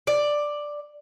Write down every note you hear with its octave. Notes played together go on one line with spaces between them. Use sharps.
D5